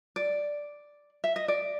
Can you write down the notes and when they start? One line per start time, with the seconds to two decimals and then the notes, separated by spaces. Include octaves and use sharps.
0.16 D5
1.24 E5
1.36 D#5
1.48 D5